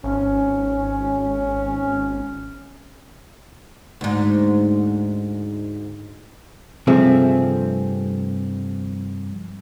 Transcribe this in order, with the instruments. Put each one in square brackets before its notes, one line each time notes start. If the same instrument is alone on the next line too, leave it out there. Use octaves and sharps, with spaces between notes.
[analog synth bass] G#1 [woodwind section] C#4
[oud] D2 G#2
[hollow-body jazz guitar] G2 C3 F3 A3 C4 G#4